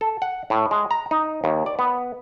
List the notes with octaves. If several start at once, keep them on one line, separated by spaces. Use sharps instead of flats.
A4
F#5
A2
G#3
A#5
D#4
D#2
D5
B3